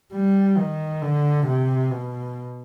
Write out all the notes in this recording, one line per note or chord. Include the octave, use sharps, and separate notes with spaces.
G3
D#3
D3
C3
B2